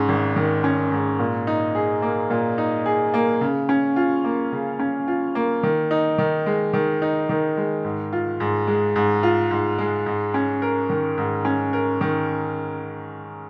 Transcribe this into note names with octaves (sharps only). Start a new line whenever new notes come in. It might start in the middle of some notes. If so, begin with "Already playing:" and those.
Already playing: G#2 C#4
G#1
D#3
C#4
G#2
A#2
D#4
G#4
A#3
A#2
D#4
G#4
A#3
C#3
C#4
F4
A#3
C#3
C#4
F4
A#3
D#3
D#4
D#3
G#3
D#3
D#4
D#3
G#3
G#2
F4
G#2
G#3
G#2
F4
G#2
G#3
G#2
C#4
A#4
D#3
G#2
C#4
A#4
D#3